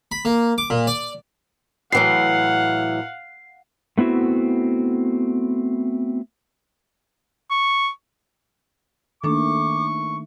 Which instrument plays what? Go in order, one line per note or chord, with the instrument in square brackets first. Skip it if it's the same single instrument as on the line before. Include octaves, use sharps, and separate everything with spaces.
[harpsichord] B5
A#3
D6
A#2
D5
[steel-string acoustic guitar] A2 E3 F#3 [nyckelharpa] F5 F#5 [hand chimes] C7
[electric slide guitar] A3 B3 C4 E4 F#4
[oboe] C#6
[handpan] D#3 A3 [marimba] A#3 D4 A4 [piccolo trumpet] C#6 [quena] D6